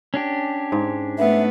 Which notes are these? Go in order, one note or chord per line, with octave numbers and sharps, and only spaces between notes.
C#4 D4 G4
G#2
A3 B3 E5